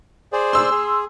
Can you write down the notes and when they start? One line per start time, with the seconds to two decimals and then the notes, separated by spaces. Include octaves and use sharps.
0.33 G#4 C5 D5
0.53 C6 E6
0.70 G#4